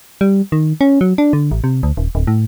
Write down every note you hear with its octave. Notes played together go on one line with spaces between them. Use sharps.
G3
D#3
C#4
F#3
D4
D3
A1
C3
D2
D#1
D1
A2